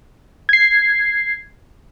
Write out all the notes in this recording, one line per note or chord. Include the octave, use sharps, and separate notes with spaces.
G#6 C7